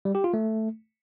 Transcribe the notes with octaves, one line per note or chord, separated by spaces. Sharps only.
G3
G4
F4
A3